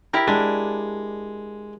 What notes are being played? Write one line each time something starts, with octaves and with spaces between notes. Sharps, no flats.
E4 G4 A#4
G#3 D4